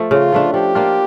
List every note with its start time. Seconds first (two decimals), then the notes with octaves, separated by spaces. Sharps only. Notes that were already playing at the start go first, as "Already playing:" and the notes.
Already playing: F3 A3
0.11 C#3 F4
0.32 F3 A3 D4
0.53 F3 G4
0.75 A#3 D4 F4